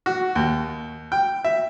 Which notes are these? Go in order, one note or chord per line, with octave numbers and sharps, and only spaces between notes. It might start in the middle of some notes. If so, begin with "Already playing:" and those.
F#4
D#2
G5
E5